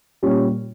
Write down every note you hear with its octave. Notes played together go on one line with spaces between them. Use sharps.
A#2 G3 C#4